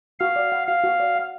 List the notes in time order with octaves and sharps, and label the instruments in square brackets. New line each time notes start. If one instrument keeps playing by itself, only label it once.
[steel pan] F#4 [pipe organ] F5
[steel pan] D5
F#5
[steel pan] F#4 [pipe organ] F5
[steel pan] F#4
D5
F#5